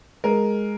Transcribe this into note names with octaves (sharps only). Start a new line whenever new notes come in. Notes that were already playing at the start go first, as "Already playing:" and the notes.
G#3 A#4